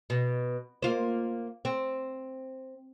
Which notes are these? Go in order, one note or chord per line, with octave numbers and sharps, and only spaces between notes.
B2
A#3 F4 C5
C4